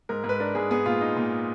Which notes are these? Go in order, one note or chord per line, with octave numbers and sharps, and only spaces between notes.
G#2 A#4
G#2
B4
D4 A#4
G#2 G#4
B3 G#4
A#2 F4
D#4
A#2